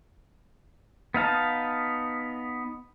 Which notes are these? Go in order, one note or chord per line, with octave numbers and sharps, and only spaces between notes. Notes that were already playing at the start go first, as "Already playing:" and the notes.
B3 D#4 F5 A5